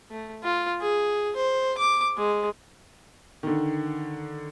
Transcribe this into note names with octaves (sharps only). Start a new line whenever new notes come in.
A3
F4
G#4
C5
D6
G#3
D3 D#3